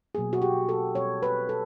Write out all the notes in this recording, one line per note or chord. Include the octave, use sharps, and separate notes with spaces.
B2 F#3 A#3 G#4
F#4
G4
A4
B2 G3 C4 C#5
B4
A4